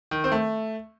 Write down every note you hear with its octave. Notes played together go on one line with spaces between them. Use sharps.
D#3
C4
A3